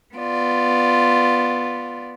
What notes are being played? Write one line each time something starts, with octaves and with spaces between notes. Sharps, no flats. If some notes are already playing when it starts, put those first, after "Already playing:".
B3 F4 D5